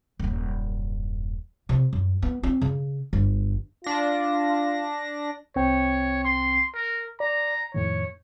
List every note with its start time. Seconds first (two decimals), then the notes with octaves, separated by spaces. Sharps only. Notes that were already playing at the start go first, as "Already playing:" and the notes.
0.19 D#1 F#2
1.69 C3
1.93 F#2
2.22 B3
2.43 C4
2.61 C#3
3.13 G1
3.84 D4 F4 A#6
5.56 C2 C4 C#5 G5
6.24 C6
6.74 A#4
7.20 D5 A#5
7.74 F2 A2 D#3 C#5